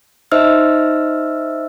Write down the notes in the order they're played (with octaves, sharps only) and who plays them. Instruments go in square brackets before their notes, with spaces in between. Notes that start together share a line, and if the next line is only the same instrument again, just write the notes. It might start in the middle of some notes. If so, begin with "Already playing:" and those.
[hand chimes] D#4 C5 D#5 E5 E6 F6